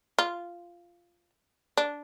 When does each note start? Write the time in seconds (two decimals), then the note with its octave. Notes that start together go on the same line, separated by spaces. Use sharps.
0.18 F4
1.77 D4